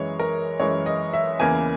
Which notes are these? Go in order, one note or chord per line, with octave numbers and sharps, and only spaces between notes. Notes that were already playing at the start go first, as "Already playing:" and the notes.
Already playing: F#2 E3 G#3 C#5
A#4
F#2 E3 G#3 C#5
D#5
E5
E2 C#3 E3 A#3 G#5